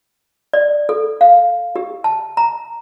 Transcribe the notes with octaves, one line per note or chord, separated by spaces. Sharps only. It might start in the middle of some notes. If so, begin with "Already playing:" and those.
D5
A4
F5
G4
A5
A#5